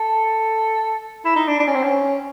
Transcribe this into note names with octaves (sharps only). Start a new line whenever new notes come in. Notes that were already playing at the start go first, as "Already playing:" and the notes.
Already playing: A4
E4
D#4
D4
D4
C#4
C4
C#4